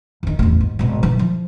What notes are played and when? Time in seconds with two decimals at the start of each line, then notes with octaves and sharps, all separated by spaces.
0.23 E2 D#3
0.39 A1 E2
0.61 G#2
0.79 G#1 B2
1.03 D#3 E3
1.19 F3